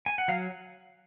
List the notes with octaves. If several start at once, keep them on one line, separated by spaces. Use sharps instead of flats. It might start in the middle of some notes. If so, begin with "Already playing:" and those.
G#5
F#5
F#3 F5